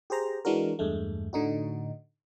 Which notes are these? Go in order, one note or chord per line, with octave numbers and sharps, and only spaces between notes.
G4 G#4 C5 A#5
E3 G#3 D4 F#4 A#4
E2 G2 G#3 A3
A2 D3 D#4 F#4